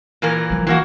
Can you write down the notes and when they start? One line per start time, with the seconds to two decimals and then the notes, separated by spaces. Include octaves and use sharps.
0.22 A#2 E3 A#4
0.50 F3 G3
0.67 E3 A#3 F#4